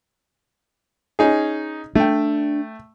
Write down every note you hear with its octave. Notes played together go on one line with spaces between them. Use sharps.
C#4 D#4 G#4
A3 D4 G5